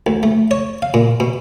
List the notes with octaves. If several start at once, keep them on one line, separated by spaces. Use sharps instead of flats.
D2
A3
C#5
F5
A#2
B2